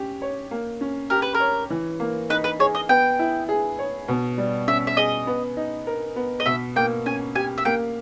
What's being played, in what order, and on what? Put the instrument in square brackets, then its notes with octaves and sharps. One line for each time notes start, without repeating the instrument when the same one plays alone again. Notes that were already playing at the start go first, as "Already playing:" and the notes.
Already playing: [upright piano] C#4 G4
C#5
A#3
C#4
[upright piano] G4 [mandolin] A#4
[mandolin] B4
A#4
[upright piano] C#5
E3
A#3
[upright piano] D#4 [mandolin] B4
[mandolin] B4
[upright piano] G#4 [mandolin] C#5
[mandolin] D#5
[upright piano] B3 [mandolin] G5
[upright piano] E4
G#4
C#5
B2
G3
[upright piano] C#4 [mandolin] E5
[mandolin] E5
[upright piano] G#4 [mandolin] D#5
[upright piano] B3
D#4
A#4
B3
[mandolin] D#5
[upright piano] B2 [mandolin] E5
[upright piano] A#3 [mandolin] G5
[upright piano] C#4 [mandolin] G#5
[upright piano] G4 [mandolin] G#5
[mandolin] E5
[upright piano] A#3 [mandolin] G5